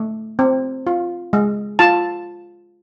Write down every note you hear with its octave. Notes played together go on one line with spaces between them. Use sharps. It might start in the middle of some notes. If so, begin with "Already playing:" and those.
Already playing: A3
C4
F4
G#3
F4 A5